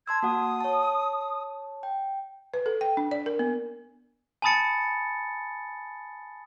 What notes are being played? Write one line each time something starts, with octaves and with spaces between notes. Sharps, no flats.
A5 C6 E6 G#6
A#3 F#4 F#5 D#6
C#5 A5
G5
B4
A4
G5
D4
D5
A#4
B3
G#5 A5 B5 D#6 A6 C#7